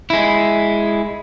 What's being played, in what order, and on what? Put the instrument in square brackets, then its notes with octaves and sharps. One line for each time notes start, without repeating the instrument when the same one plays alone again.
[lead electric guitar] G#3 E4